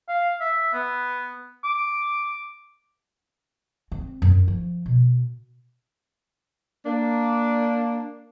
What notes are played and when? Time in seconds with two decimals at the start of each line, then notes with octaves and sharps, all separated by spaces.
0.09 F5
0.40 E5
0.74 B3
1.64 D6
3.92 C4
4.22 F#2
4.48 F3
4.86 B2
6.85 A#3 D4